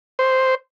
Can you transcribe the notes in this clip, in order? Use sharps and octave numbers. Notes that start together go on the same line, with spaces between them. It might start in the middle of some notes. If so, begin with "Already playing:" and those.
C5